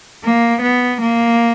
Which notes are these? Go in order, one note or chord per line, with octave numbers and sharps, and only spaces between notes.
A#3
B3
A#3